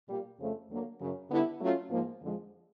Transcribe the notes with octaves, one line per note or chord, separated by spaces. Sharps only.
A#2 G3 A#3
F2 C#3 F3 A3
D2 D3 F#3 A#3
F#2 C#3 F#3
D3 G3 B3 E4
F#3 A3 C#4 F4
G#2 F3 A#3
F2 D3 F3 G#3